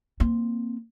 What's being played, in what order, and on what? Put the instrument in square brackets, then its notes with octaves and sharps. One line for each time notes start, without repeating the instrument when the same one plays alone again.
[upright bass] A#3 C4